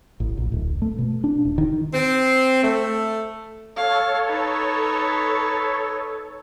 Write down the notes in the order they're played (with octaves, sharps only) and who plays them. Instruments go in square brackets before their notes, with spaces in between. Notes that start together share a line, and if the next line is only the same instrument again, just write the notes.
[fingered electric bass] A1
A#1
D1
A3
B2
D4
D#1
D#3
[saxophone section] C4
A3
[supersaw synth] A4 C#5 [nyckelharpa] F5
[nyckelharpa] D#4 B4